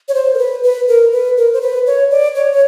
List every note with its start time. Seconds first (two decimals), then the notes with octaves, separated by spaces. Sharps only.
0.09 C#5
0.14 C5
0.34 A#4
0.38 B4
0.63 B4
0.88 A#4
1.12 B4
1.37 A#4
1.53 C5
1.61 B4
1.87 C#5
2.11 D5
2.35 C#5
2.52 C#5